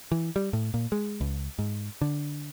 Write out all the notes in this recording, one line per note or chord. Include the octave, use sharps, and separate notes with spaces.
E3
G3
A2
A#2
G#3
C#2
G#2
D3